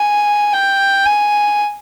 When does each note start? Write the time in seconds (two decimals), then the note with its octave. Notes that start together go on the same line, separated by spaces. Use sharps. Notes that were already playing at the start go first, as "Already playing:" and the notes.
Already playing: G#5
0.53 G5
1.05 G#5